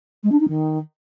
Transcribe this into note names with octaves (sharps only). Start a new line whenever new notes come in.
G#3
D4
D#4
D#3